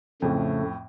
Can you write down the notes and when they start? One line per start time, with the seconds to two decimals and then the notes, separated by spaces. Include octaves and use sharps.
0.22 F2 A2 C#3 A3